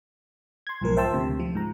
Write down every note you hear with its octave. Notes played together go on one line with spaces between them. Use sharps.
C6 G#6
B1 G#2 F3 A#4
C5 E5 G5 A5 C6 E6
D2 C3
F3
G#2 A#5